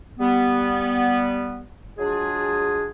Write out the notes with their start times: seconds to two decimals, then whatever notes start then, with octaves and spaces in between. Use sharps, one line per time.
0.20 G3 B3
1.98 F#3 G#3 D4 F4 G#4